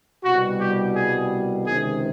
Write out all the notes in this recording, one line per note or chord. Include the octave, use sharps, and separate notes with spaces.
C2 B2 G3 F#4
G4
G#4
C#2 C3 D#3 G#4